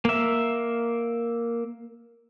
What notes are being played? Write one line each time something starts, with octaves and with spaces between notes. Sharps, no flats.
A#3 E5